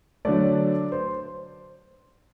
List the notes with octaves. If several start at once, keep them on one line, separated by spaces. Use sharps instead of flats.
D3 F#3 A3 D5
C5